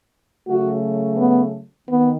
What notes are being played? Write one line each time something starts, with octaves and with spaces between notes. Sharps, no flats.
C#3 F#3 A3 F#4
B3
D#3 B3